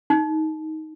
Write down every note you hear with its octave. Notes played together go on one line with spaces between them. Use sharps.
D#4